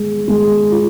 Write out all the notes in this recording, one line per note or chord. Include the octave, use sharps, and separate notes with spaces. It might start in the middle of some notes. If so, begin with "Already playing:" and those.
Already playing: G#3
G#3
F4